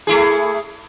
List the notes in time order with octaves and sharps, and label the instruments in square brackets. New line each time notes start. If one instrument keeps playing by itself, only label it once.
[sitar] A3 E4 G#4